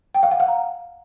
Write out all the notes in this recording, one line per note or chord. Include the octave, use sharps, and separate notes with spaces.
G5
F5
F#5
F5
A#5